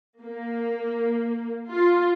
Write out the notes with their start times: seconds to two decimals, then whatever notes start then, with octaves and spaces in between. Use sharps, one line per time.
0.19 A#3
1.70 F4